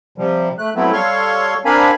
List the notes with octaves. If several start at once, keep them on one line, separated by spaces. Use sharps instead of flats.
C3 F3 G3
A3 F#6
F#3 A3 B3 C4 E4
G3 A4 C#5 F5 C6 C#6
C4 D4 A#4 F5 G#5 B5